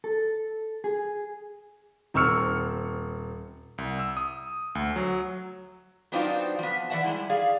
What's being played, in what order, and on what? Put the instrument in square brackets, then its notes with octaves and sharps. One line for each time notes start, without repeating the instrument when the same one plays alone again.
[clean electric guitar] A4
G#4
[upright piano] D#1 C4 C#6 E6 F6 C#7
[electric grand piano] C2
E6
D#6
D2
F#3
[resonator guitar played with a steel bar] F#3 B3 C4 D4 D#4 F4
F3 B3
E3 D5 E5 F#5 A5
G3 G#3 E4
G#4 D5 F5